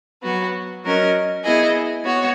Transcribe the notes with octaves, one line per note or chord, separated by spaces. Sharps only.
F#3 B3 F#4
F#3 C#4 F#4 A#4 D#5
B3 E4 G#4 D#5
B3 F#4 C#5